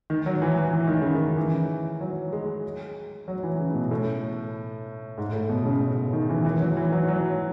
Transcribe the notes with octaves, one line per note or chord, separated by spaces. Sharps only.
D#3
F#3
E3
E3
E3
D#3
C#3
D#3
E3
F#3
G#3
F#3
E3
C#3
B2
A2
G#2
A2
B2
C#3
C#3
D#3
E3
E3
F#3
E3
F#3
F#3